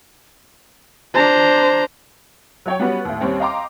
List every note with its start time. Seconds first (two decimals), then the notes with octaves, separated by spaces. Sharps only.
1.14 D4 C5 A#5
2.66 F#3 C#5 G5
2.79 G3 B3 C#4 F#4 B4
3.05 D#2 A2
3.20 D#2 G3 C4 C#4
3.40 D#5 F5 G5 A#5 C6 D6